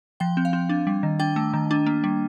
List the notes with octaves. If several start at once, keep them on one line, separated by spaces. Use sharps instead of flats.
F3 G5
C4
F5
C4
D4
G3
D#3
D4 G5
A3
D#3
D4
A#3
G3